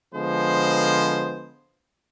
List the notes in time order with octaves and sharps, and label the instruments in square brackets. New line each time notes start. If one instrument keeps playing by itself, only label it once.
[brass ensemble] D3 F3 G#3 B3 G#4 C5